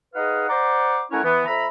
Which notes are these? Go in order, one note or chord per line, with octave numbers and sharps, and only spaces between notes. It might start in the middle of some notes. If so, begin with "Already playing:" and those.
D#4 G#4 B4 D#5 F5 F#5
C5 D5 F#5 A#5 C6 D6
A3 C#4 E4 A#4 C#5 F#5
E3 B3
F2 E5 A#5 B5